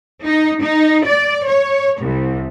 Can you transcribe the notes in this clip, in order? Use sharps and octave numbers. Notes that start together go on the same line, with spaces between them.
D#4
D#4
D5
C#5
C2